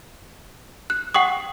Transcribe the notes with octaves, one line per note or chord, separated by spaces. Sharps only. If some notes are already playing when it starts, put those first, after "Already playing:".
F#6
F#5 G5 C#6 D#6